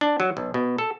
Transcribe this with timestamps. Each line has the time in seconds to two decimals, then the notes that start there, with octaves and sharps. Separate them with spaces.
0.01 D4
0.20 F#3
0.37 B1
0.54 B2
0.78 A4